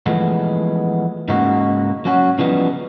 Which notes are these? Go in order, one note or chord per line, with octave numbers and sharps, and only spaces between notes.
E3 F3 G#3 A3 B3
G#2 C#3 A#3 D#4 F#4
F#3 C#4 F#4
C#3 E3 F3 G3 B3 D#4